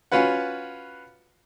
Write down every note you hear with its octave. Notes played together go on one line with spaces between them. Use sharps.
C#4 F4 F#4 B4 F#5